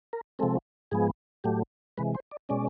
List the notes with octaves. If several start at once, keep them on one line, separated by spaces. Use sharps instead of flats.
A#4
C3 F3 G#3 C4 A4
G#2 F3 G#3 B3 G#4
A2 F#3 A3 G4
C3 E3 G#3 B4
C5
D5
B2 G#3 C#4 D5